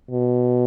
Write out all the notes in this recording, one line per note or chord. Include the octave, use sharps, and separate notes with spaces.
B2